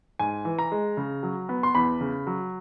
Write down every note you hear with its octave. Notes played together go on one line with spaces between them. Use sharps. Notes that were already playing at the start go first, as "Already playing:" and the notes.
G#2 G#5
E3
A#5
G#3
C#3
F#3
B3
C6
E2 B5
C#3
F#3